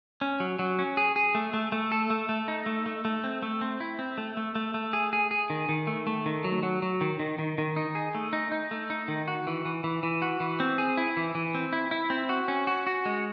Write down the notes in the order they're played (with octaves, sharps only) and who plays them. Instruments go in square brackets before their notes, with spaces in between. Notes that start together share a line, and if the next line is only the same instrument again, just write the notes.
[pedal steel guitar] C#4
F#3
F#3
C#4
G#4
G#4
A3
A3
A3
A4
A3
A3
D#4
A3
A3
A3
C4
A3
C4
E4
C4
A3
A3
A3
A3
G#4
G#4
G#4
D#3
D#3
A3
A3
D#3
F#3
F#3
F#3
D#3
D#3
D#3
D#3
D#4
G#4
A3
D#4
D#4
A3
D#4
D#3
F#4
E3
E3
E3
E3
F#4
E3
C4
G#4
E4
E3
E3
C4
E4
E4
C4
F#4
C#4
F#4
F#4
G#3